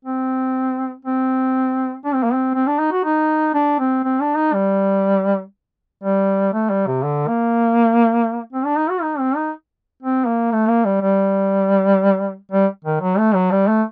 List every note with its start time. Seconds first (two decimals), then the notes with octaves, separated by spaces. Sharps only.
0.05 C4
1.05 C4
2.05 D4
2.14 C4
2.23 A#3
2.33 C4
2.54 C4
2.67 D4
2.79 D#4
2.92 F#4
3.04 D#4
3.54 D4
3.79 C4
4.04 C4
4.21 D4
4.37 D#4
4.53 G3
6.03 G3
6.53 A3
6.70 G3
6.87 C3
7.03 D3
7.28 A#3
8.53 C4
8.65 D4
8.78 D#4
8.90 F#4
9.02 D#4
9.19 C4
9.36 D#4
10.02 C4
10.27 A#3
10.52 A3
10.68 A#3
10.85 G3
11.01 G3
12.51 G3
12.84 D#3
13.01 F#3
13.18 A3
13.34 F#3
13.51 G3
13.68 A3